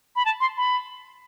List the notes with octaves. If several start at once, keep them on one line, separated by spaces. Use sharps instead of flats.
B5
A5
C6
B5